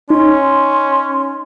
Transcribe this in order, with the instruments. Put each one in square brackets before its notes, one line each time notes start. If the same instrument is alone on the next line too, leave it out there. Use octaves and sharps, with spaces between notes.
[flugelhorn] C#4 [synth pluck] D#4 [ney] C6